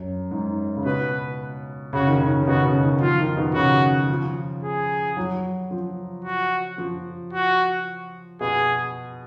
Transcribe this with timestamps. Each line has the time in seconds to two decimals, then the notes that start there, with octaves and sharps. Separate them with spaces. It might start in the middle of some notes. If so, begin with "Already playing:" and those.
Already playing: F#2
0.31 G#2
0.76 C#3
0.85 B2 B4
1.93 C#3 F#4
2.07 D#3
2.21 C#3
2.42 C#3
2.47 B2 F#4
2.65 C#3
2.83 D#3
3.01 F3 F4
3.19 D#3
3.37 B2
3.54 C#3 F#4
4.08 F3
4.63 G#4
5.17 F#3
5.71 F3
6.25 F#4
6.78 F3
7.33 F#4
8.41 B2 G#4